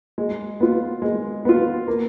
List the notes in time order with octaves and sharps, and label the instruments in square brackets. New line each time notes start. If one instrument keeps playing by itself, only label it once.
[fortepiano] G#3
B3 F4
G#3
B3 F4
A#3